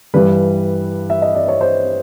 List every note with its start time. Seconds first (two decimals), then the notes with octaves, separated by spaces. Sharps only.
0.14 G2 E3 G3 B4
1.10 E5
1.22 D#5
1.35 D5
1.48 C#5
1.61 C5